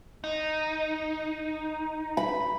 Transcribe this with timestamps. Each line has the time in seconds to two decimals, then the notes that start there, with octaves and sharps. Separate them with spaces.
0.24 D#4
2.17 B5